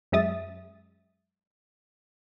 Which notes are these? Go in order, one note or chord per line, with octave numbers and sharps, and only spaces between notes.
F#2 G#3 E5 D#6 A6